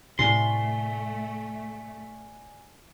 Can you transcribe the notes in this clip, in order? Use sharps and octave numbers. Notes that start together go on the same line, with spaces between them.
A2 C3 A3 D5 F#5 G#5 C6